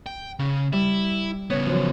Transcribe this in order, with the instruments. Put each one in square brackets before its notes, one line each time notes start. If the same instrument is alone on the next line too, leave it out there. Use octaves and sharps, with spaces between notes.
[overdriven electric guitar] G5
C#3
[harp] G3 [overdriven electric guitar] E4
[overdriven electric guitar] C#3 B3 [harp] C#5
[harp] F#2 E3 F3